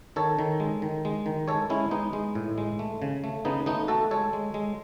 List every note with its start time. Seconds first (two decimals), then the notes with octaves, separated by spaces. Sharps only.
0.16 D#3 A4 C#5
0.39 D#3
0.60 G#3
0.82 D#3
1.05 G#3
1.26 D#3
1.48 G#3 A4 C#5
1.70 G#3 C#4 E4
1.91 G#3 B3 D#4
2.13 G#3
2.35 A2
2.58 G#3
2.79 A3
3.02 C#3
3.24 A3
3.45 C#3 B3 D#4
3.66 A3 B3 D#4
3.88 A3 F#4 A4
4.11 G#3 A4 C#5
4.33 G#3
4.54 G#3